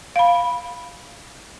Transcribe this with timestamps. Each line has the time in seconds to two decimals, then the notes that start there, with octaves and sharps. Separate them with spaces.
0.16 F5 B5